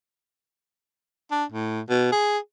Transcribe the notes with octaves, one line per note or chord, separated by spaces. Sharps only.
D4
A2
B2
G#4